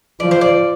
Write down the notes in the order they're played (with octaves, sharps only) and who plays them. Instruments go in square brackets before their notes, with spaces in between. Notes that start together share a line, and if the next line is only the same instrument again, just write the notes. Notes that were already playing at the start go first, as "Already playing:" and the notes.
[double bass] F3 [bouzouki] D5
[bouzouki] C5
D5